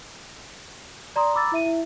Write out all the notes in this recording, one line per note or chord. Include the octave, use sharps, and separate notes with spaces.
D5 A#5 C6 D#6
A#5 B5 D6 E6 A6
E4 E5 D#7
E4 E5